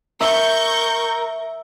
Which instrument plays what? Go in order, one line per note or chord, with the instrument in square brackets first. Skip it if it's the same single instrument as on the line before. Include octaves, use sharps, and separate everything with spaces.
[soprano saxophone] A#4 [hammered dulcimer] E5 [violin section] C#6 G6